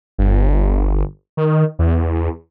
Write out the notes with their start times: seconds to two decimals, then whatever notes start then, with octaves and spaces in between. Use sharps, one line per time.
0.18 G1
1.37 D#3
1.79 E2